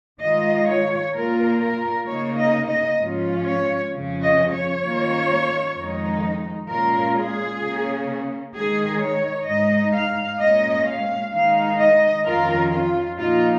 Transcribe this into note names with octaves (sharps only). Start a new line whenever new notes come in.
D#3 G#3 F4 D#5
C#5
A#2 A#3 F4 A#4
A#4
C#3 A#3 D#4 C#5
D#5
D#5
G#2 F3 C#4 F4
C#5
F2 C#3 F3 C#4
D#5
C#5
D#3 A#3 C#4 F4
F2 D#3 G#3 D#4
A#2 G#3 C#4 F4 A#4
G#4
C#3 A#3 C#4
D#3 G#3 D#4 G#4
C#5
G#2 G#3 D#4 D#5
F5
A#2 G#3 C#4 D#5
F5
D#3 G#3 D#4 F5
D#5
F2 D#3 C#4 F4 A#4
F4
A#2 F3 A#3 D#4 F4